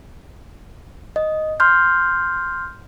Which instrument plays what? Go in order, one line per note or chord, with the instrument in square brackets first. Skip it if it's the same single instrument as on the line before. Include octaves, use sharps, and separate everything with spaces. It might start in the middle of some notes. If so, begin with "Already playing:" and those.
[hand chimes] D#5
C6 F6 G6